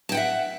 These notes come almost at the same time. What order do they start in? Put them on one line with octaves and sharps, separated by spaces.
A5 G5 F#5 E5